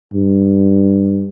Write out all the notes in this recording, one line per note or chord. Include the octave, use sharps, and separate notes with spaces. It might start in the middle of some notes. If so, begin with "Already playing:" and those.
G2